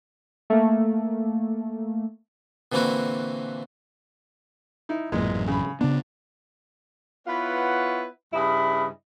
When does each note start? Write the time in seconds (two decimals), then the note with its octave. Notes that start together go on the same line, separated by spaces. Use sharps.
0.50 A3 A#3
2.72 A#2 D3 E3 C4 E4 F#4
4.89 D#4 E4
5.12 A1 F#2 A#2 E3 G#3
5.48 C#3 B5
5.81 C#3 B3 D4
7.27 B3 E4 F4 B4 C#5 F#5
8.34 G2 C#3 E4 D#5 B5